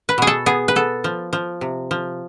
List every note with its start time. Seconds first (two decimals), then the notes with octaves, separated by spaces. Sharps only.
0.09 B4
0.18 B2 G#4
0.27 A4
0.46 B3 G#4
0.68 B4
0.76 B3 A4
1.04 F3
1.33 F3
1.61 C3
1.91 F3